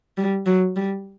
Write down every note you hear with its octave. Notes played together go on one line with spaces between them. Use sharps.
G3
F#3
G3